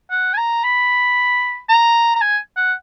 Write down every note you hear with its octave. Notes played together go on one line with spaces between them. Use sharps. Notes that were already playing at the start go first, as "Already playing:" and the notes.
F#5
G#5
A#5
B5
A#5
A#5
G#5
F#5